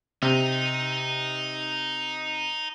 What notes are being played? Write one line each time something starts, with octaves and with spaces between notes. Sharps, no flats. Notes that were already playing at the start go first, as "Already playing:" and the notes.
C3 D#4